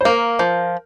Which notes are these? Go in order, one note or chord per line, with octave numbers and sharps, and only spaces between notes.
C5
A#3 A#4
F3